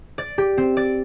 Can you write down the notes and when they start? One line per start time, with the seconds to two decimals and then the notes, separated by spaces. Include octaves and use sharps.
0.18 D5
0.38 G4
0.58 C4
0.77 D5